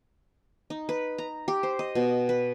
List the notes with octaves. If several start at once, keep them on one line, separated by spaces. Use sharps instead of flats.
D#4
B4
A#5
G4
C5
D#5
B2
B4